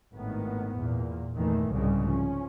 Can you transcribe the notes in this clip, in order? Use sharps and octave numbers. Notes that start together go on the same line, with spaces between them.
G#1 A2 D#3 B3
E2 A#2
G1 E2 A#2 D#3 E3 A3
C2 G#2 C#3 G3 G#3
F3 C#4